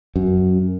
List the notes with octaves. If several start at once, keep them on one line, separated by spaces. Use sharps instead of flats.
F#2